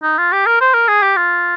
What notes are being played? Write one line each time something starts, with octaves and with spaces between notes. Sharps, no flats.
D#4
F4
G4
A#4
C5
A#4
G#4
G4
F4